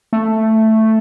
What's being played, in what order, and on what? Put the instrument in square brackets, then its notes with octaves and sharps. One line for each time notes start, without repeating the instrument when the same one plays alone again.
[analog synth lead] A3